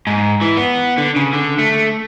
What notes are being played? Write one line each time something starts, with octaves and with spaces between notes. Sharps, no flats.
G#2
E3
B3
D3
C#3
D3
A3